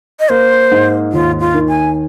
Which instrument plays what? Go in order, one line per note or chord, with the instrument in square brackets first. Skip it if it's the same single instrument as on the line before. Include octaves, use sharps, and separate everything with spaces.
[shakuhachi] D#5
[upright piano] A#3 [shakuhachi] C5
[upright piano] G#2
[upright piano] D#2 [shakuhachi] F4
[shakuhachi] F4
[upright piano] D#3
[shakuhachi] G#5